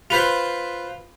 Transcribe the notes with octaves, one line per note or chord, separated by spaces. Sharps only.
F4 B4 C5